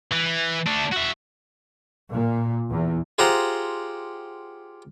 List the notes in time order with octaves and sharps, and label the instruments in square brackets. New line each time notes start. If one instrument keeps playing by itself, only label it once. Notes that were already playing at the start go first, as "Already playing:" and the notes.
[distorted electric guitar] E3
A3 D4
F#4 E5
[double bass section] A#2
E2
[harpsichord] F4 G4 G#4 C5 F#5 A#5